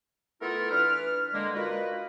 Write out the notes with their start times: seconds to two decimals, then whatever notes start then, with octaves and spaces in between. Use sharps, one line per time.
0.41 A3 B3 E4 F4 A4 A#4
0.71 E3 D4 B4 F6
1.34 D3 G#3 A#3
1.56 D#4 F4 F#4 A#4 B4